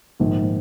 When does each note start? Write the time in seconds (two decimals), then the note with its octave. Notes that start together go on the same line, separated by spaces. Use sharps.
0.20 A#1 G#2 D#3